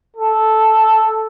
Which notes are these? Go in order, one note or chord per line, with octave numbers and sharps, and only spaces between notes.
A4